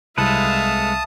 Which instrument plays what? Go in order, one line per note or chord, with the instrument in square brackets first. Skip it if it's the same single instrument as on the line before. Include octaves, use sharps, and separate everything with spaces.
[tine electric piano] C2 [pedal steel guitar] G#3 A4 B4 [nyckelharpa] E5 F5 [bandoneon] A5 D#6